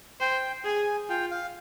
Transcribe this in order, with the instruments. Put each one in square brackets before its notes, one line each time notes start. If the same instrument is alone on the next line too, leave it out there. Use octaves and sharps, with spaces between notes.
[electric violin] C5 [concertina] G5
[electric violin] G#4 [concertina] G#5
[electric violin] F4 [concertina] G5
[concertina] F5